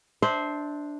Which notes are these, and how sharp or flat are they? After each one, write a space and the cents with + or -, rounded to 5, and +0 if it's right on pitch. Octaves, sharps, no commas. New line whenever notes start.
D4 +0 C5 +0 E5 -30